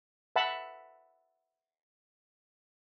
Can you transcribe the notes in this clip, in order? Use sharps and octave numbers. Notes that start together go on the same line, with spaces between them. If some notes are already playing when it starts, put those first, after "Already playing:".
E5 F#5 A5 B5